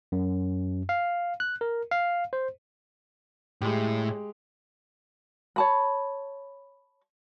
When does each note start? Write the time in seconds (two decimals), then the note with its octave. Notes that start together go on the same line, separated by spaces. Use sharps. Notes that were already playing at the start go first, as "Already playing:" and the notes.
0.12 F#2
0.89 F5
1.40 F#6
1.61 A#4
1.91 F5
2.33 C5
3.61 A2 G#3 G4
5.56 C#5 A5 B5